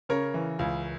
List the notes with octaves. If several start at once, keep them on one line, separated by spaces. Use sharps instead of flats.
C#3 A#4 C#5
E3
C#2